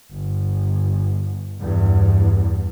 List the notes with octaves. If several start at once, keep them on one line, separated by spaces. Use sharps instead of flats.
G1
E2 G2